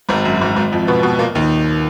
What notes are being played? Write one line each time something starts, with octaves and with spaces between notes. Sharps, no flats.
G#1 G#2
F#2
G#1 G#2
G#1 G#2
F2 F3
B2 B3
B2 B3
A#2 A#3
D#2 D#3